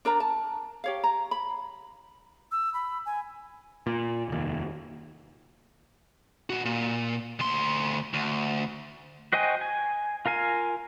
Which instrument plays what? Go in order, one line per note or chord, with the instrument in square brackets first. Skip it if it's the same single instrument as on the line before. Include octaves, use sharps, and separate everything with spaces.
[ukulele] D4 A#4 D5 A#5
A5
G4 C#5 F5
A#5
B5
[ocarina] E6
B5
G#5
[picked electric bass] A#2
F1 D#2
[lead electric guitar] A#2 F#4
A#2
D2 C6
D2
[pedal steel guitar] F#4 C5 D#5 G5 G#5
G#5
F4 A#4 F5 G#5